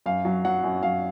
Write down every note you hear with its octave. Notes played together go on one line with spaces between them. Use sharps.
F#2 F5
F#3
F#3 F#5
F#2
F#2 F5